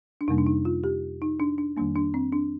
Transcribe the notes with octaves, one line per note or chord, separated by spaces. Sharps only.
D4
F2 C3 G3 A#3 D#4
D4
D#4
F4
G4
D#4
D4
D4
F2 D#3 G3 A#3 D4
D4
C4
D4